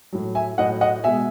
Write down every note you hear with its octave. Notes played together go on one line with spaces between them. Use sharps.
A2 F#3
E5 G#5
A2 F#3 D#5 F#5
D#5 F#5
B2 G#3 E5 G#5